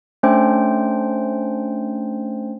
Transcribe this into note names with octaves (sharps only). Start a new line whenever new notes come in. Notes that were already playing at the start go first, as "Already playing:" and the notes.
A3 C#4 D4 C5 G5